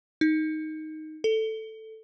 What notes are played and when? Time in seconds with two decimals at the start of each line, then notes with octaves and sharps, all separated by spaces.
0.21 D#4
1.24 A4